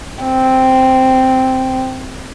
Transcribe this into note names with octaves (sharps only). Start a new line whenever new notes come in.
C4